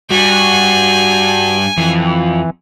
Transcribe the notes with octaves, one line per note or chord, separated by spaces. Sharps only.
G2 G3 F#4 G#5
F2 E3